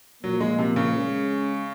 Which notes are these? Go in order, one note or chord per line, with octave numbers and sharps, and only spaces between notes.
A#2 F3 F#3 A#3
G#3
C3
C#3
G#3 C#4 G#4